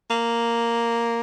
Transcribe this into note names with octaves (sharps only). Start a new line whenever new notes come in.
A#3